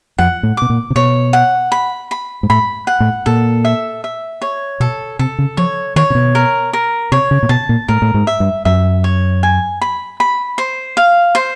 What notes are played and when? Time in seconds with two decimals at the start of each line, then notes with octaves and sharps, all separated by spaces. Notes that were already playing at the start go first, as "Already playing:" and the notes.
0.18 F2 F#5
0.43 A2
0.57 B2 D6
0.70 A#2
0.90 C3
0.95 B2 C#5
1.33 F#5
1.72 B5
2.11 B5
2.43 G#2
2.50 A2 B5
2.87 F#5
3.00 A2
3.26 A#2 A4
3.65 E5
4.04 E5
4.42 C#5
4.80 B2 A4
5.19 C3 A4
5.38 C#3
5.57 F3 C#5
5.96 D#3 C#5
6.10 C3
6.15 B2
6.35 A#4
6.73 A#4
7.12 C3 C#5
7.31 C#3
7.43 A#2
7.49 B2 A5
7.69 A#2
7.88 A2 A#4
8.02 A2
8.14 G#2
8.27 E5
8.40 G2
8.65 F#2 E5
9.04 C#5
9.43 G#5
9.81 B5
10.20 B5
10.58 C5
10.97 F5
11.35 C5